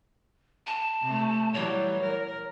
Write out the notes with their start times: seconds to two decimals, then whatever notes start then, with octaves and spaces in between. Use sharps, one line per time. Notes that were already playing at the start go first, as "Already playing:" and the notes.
0.67 A5
1.02 C3 A3
1.54 E3 F#3 G3 C#5
2.02 A#4